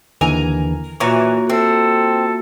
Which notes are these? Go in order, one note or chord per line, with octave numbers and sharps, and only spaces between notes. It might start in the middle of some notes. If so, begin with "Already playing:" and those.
D#2 D3 E3 A#4 G#5 A#5
A#2 E3 A#3 F4 F#4 C#5 A#5 C#6
C4 A4 E5